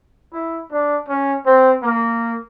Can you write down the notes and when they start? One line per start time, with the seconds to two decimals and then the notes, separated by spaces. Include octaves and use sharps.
0.33 E4
0.71 D4
1.08 C#4
1.46 C4
1.82 A#3